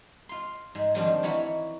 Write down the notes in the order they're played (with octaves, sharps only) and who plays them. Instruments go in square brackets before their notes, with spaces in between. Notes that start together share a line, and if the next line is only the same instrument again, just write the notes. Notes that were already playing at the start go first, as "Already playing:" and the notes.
[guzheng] F4 C6
G#2 G#3
D3 D#3 F3 G3 C4 D4
E3 D#4 E4 F#4 C#5